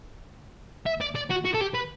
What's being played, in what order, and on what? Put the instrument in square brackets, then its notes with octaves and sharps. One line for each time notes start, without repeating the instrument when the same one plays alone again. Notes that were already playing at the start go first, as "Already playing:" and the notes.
[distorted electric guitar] E5
D5
D5
F#4
F#4
A4
G4
B4